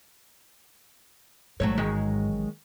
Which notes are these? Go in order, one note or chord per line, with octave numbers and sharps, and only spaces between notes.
A1 G#2 F#3 A3 C#5
D#3 F#3 G#3